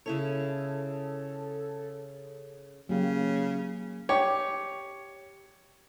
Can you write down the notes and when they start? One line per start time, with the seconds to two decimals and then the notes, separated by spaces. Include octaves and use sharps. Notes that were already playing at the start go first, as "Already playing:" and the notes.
0.06 C#3 E4 A4 C#5
2.89 C#3 F#3 A#3 G4
4.09 G4 C#5